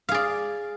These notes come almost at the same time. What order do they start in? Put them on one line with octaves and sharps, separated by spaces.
F5 G#4 D5